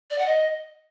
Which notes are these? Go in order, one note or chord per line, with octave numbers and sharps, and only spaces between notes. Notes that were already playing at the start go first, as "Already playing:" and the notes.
D5
F#5
D#5